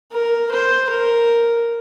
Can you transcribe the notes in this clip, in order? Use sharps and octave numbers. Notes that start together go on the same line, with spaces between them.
A#4
C5
A#4